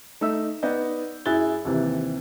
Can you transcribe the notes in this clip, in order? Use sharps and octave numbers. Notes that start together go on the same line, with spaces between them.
A3 D#4 E5 E6
B3 D#4 D5 D#5 G6
F#2 E4 G#4 F#6 A6 G7
D#2 C3 E3